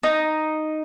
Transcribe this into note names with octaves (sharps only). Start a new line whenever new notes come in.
D#4